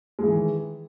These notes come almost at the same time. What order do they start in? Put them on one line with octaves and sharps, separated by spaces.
G#3 E3 D#3